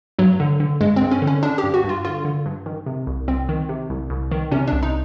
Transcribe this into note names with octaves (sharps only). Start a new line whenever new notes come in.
G2 F#3
D3
D3
G2 G#3
C4
G2
C#4
D3
C#4
D3 D4
G4
G2
F#4
G2
F4
D3 F4
D3
G2
D#3
C3
C2
C2 C4
D#3
C3
C2
C2
D#3
C3 C#4
C2 D4
D#4